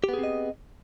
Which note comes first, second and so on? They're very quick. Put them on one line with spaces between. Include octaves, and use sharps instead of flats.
G4 B3 G#4 C4 D#5